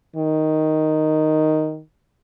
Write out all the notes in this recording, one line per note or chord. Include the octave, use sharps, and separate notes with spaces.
D#3